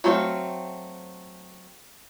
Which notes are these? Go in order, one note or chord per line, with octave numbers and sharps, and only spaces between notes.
F#3 A3 C4 D4 F5